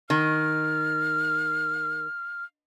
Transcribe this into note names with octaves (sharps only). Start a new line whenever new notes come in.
D#3 F6